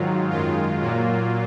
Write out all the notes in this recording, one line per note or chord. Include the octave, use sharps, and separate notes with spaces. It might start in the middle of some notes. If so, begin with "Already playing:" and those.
Already playing: G#2 D#3 F#3 F4
F#2 D#3 G#3 F4
A#2 F#3 A#3